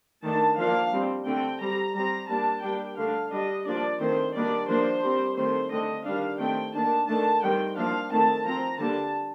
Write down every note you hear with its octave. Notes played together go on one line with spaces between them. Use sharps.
D#3 A3 D4 A5
F3 A#3 D4 F5
G3 C4
D3 A3 C4 G5
G3 C4 A#5
G3 C4 A#5
G3 A#3 D4 A5
G3 A#3 D4 G5
D3 A3 D4 F5
G3 D4 D#5
F3 A#3 D4 D5
D#3 A3 C4 C5
D#3 G3 A#3 D4 D5
F3 A#3 D4 C5
G3 C4
D#3 A3 C4 C5
D3 A3 C4 D#5
D#3 G3 D4 F5
D#3 A3 C4 G5
D#3 A#3 D4 A5
D#3 A3 D4 A5
D#3 G3 C4 G5
F3 A#3 D4 F5
D#3 A3 C4 A5
F3 C4 A#5
D3 G3 A#3 D4 A5